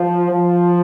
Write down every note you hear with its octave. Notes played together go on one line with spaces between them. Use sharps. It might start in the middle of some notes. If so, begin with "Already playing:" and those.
Already playing: F3
F3